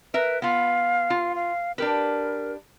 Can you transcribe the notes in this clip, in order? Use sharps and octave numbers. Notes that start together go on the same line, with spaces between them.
A#4 B4 E5
B3 F4 F5
F4
F5
D4 G4 A#4 B4